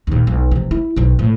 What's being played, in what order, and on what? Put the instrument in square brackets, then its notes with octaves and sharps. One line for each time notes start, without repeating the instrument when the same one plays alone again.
[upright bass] D#2 A#2
B1
C3 E3
E4
B1 B2
A2